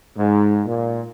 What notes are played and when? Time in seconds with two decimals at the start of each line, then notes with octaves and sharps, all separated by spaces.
0.17 G#2
0.67 A#2